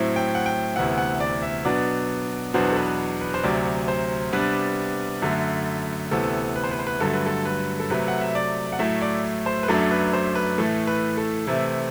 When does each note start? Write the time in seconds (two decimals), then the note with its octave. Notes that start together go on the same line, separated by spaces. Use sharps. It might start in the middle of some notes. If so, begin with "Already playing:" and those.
Already playing: A2 F#3 C4 E4
0.16 G5
0.35 F#5
0.46 G5
0.76 D2 C3 E3 B3 E4 F#5
0.98 F#5
1.20 D5
1.43 E5
1.65 B2 F#3 B3 D4 D5
2.54 E2 B2 F#3 B3 D4 C5
2.72 A4
2.76 B4
3.21 B4
3.34 C5
3.43 D2 C3 F#3 D5
3.88 C5
4.32 C3 G3 B3 D4 B4
5.22 F#2 D3 A3
6.11 D2 C3 E3 B3 A4
6.56 B4
6.64 C5
6.71 B4
6.79 C5
6.87 B4
7.00 G2 D3 F#3 A3 A4
7.13 B4
7.26 A4
7.45 B4
7.80 A4
7.90 C3 F#3 A3 B4
8.08 F#5
8.21 E5
8.35 D5
8.72 F#5
8.79 A2 F#3 A3 E4 E5
9.02 D5
9.46 C5
9.63 B4
9.68 F#2 F#3 A3 D4 A4
9.91 B4
10.13 C5
10.35 B4
10.58 A2 E3 A3 A4
10.87 B4
11.17 A4
11.47 C3 E3 A3 C4 E4